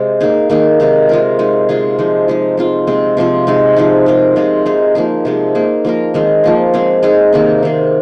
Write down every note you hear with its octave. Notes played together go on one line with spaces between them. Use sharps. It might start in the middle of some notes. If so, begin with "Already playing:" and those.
Already playing: C3 G#3 C4
A#3 D#4 G#4
D#3 A#3 D#4 G#4
C3 G#3 D#4
G#3 F4 A#4
G#3 D#4 G#4
C3 G#3 F4 G#4
F3 G#3 D#4
F3 G#3 D#4
G#3 C4 F4
C3 G#3 C4
C3 F3 C4 F4
C3 G#3 D#4
F3 G#3 D#4
G#3 F4 A#4
C3 G#3 F4
G#3 D#4 G#4
F3 A#3 D#4 G#4
C3 F3 G#3
A#3 D#4 G#4
F3 A#3 F4 A#4
D#3 G#3 C4
F3 A#3 F4
G#3 C4 G#4
G#3 D#4 G#4
C3 D#3 A#3 D#4
D#3 C4 G#4